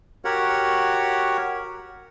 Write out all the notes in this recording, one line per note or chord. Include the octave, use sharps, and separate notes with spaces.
F#4 G4 A#4 C#5 F#5